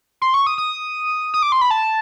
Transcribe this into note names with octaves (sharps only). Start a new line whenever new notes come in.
C6
C#6
D#6
D#6
D#6
D6
C6
B5
A5